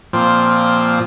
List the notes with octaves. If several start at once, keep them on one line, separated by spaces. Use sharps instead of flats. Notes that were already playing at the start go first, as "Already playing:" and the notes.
A#2 F3 C4